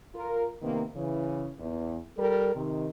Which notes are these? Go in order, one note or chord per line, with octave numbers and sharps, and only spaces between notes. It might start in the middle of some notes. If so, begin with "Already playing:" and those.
F4 A#4
C3 D#3 A#3 B3
C#3 E3
E2
G3 A4 A#4
C3 D#3